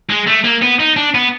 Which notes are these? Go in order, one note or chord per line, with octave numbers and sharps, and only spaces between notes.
G#3
A3
A#3
B3
D#4
D4
B3